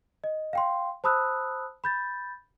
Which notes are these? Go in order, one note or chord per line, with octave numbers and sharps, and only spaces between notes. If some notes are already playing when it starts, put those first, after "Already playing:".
D#5
F5 G5 C6
C5 A5 B5 D#6 E6 F#6
B5 G6 A6